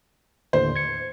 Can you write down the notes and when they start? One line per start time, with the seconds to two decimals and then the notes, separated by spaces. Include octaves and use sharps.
0.53 D#2 A2 D3 C5
0.76 G#6 C#7